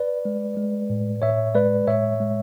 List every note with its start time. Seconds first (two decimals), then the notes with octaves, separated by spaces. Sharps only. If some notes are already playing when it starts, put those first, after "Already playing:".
Already playing: B4 D5
0.25 G#3
0.57 G#3
0.90 A2
1.22 A2 C#5 E5
1.55 G#3 B4 D5
1.87 A2 C#5 E5
2.20 G#3